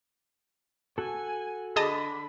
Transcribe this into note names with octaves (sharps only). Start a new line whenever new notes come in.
F#4 A4 G#5
D3 G#4 D#5 A5 B5